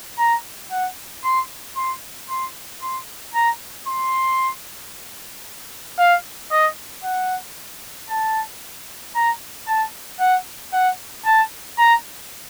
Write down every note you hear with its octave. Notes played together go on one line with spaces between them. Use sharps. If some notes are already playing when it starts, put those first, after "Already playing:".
A#5
F#5
C6
C6
C6
C6
A#5
C6
F5
D#5
F#5
A5
A#5
A5
F#5
F#5
A5
A#5